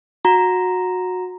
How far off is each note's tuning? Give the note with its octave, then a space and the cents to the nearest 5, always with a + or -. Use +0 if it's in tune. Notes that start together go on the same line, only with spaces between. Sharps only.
F#4 -20 A#5 +0